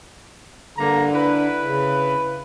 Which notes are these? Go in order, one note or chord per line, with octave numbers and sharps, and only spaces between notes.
G2 D3 A#3 A#5
E4 B4
C#3